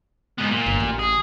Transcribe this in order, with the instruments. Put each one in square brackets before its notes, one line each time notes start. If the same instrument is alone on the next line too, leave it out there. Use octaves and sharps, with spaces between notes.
[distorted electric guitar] G#2 B3
A#2
[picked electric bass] G1
A1
[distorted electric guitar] G#4